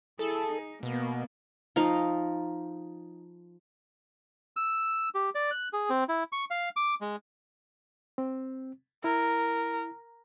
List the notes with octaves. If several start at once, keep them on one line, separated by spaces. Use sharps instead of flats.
E4 G#4 A4
D#4
B2 A#3 B3
F3 D#4 F5
E6
G4
D5
F#6
G#4
C4
E4
C#6
F5
D6
G#3
C4
E4 A#4